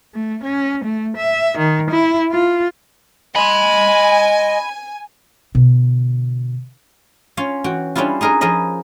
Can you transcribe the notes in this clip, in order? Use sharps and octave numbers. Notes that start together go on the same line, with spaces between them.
A3
C#4
A3
E5
D#3
E4
F4
D#5 G#5 B5 C6
B2 D3
C#4 F4 C#5 F5
E3 F#4 G5
G3 C#4 D4 E4 F4
D#4 G#4 A#4 B4 D#5
F3 G#4 A#4 D#5 B5